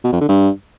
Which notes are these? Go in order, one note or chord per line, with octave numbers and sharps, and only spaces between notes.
B2
F2
D3
G2